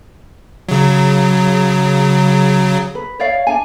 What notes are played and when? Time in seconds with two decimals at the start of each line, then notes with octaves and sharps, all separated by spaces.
0.69 C#3 F#3
2.95 B4
3.20 C#5 D5 F5
3.47 D4 G#5